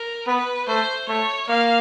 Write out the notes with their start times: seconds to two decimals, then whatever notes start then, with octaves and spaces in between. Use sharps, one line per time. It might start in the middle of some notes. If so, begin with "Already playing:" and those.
Already playing: A#4
0.27 B3 B4
0.68 A3 C5
1.08 A3 C#5
1.49 A#3 F5